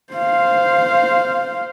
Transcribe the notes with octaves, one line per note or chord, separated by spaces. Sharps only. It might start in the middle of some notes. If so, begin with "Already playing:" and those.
C5 F5